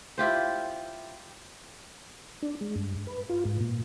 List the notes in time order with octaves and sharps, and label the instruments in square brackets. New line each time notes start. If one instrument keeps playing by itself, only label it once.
[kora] E4 F4 G4 C5
[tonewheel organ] D4
G#3
G2
B4
F4
G#2
A#2